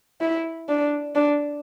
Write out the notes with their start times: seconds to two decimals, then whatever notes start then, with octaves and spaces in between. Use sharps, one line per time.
0.21 E4
0.69 D4
1.15 D4